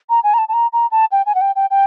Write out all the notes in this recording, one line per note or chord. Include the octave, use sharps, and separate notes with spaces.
A#5
G#5
A#5
A5
A5
A#5
A#5
A5
G5
G#5
F#5
G5
G5
G5